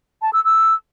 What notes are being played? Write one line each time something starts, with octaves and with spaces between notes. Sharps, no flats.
A5
E6
E6